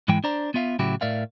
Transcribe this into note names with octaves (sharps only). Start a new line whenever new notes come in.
G#2 E3 G#3 E4 G5
D4 C5 D5 A#5
B3 F4 E5 F5
A2 C#3 F#3 E4 F#4 G4
A2 A#4 D5 E5 F5